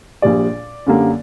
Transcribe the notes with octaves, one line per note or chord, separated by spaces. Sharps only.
A#1 A#2 G3 D5
F#2 D3 G3 A#3